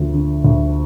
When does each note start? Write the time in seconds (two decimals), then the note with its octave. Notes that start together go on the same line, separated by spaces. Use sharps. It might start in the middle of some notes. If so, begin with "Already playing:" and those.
Already playing: D2 F3
0.14 D3
0.44 D2